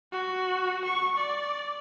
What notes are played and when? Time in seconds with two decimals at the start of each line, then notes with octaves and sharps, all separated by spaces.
0.12 F#4
0.85 C#6
1.18 D5